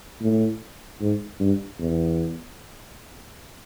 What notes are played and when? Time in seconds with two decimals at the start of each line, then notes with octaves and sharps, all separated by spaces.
0.22 A2
1.01 G#2
1.40 G2
1.79 E2